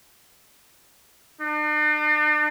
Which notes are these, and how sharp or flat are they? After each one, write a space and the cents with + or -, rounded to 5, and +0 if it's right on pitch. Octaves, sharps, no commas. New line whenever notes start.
D4 +45